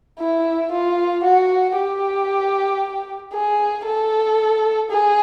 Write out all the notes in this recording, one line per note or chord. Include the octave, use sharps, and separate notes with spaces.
E4
F4
F#4
G4
G#4
A4
G#4